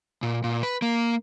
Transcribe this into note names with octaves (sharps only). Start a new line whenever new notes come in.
A#2
A#2
B4
A#3